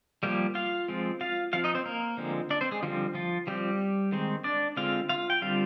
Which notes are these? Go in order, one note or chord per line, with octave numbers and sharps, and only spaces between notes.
F3 G3 A#3 G4
F4 F5
F3 G#3 C4
F4 F5
F3 C4 F4 F5
D#4 D#5
C4 C5
A#3 A#4
D3 F3 G#3 C4
D4 D5
C4 C5
G#3 G#4
D3 F3 G3 C4 F4
F3 F4
F3 G3 C4 G4
D#3 G#3 C4
D4 D5
D3 G#3 C4 F4 F5
F4 F5
G5
D3 G3 C4 F4 F5